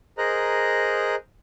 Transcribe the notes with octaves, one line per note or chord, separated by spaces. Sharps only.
G#4 A#4 C5 D#5 A#5 F#6